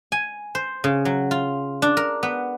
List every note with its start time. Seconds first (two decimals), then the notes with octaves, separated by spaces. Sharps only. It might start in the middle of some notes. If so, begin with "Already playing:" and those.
0.12 G#5
0.55 C5
0.84 C#3
1.05 F#3
1.31 F4
1.82 D4
1.97 A#4
2.23 B3